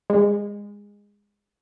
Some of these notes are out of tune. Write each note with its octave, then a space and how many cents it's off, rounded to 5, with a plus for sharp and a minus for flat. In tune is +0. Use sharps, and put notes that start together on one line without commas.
G#3 -20